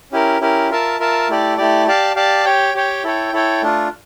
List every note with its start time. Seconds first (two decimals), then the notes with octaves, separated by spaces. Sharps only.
0.11 C#4 E4 G4 A#4
0.41 C#4 E4 G4 A#4
0.70 F4 A#4 E5 A5
1.00 F4 A#4 E5 A5
1.29 A3 E4 G4 D5
1.57 A3 E4 G4 D5
1.87 G4 D5 F5 A5
2.15 G4 D5 F5 A5
2.45 G4 C#5 G5
2.74 G4 C#5 G5
3.04 E4 A4 C#5 G5
3.33 E4 A4 C#5 G5
3.62 A3 D4 F4